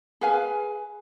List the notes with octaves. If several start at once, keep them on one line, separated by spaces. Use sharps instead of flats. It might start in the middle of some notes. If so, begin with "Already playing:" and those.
G#4 B4 F5 G#5